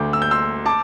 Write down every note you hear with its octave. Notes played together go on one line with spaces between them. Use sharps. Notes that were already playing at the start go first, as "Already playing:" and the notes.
Already playing: D2 D3 A3 D6 G6
E6
G6
C6 E6
A5 D6